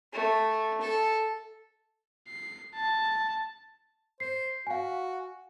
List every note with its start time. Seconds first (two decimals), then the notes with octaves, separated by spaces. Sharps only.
0.13 A3
0.81 A4
2.28 C7
2.75 A5
4.20 C5 C7
4.67 F#4 F5 G#5